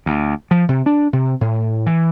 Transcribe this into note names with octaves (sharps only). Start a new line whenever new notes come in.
D2
F3
C3
D4
C3
A2
E3